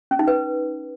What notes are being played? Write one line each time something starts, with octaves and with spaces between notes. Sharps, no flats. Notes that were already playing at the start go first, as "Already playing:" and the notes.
C#4
D#4
B4